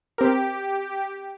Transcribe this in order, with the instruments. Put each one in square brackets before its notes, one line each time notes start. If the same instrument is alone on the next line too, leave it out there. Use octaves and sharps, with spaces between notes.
[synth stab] C4 A#4 [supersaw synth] G4